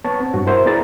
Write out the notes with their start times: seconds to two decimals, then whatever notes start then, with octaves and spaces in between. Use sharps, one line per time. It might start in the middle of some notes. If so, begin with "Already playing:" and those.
0.04 B3 C#5 A5
0.20 C4
0.34 G2 F#4
0.46 E4 A#4 C5 E5
0.66 B3 E4 G#4 D5 A#5 A6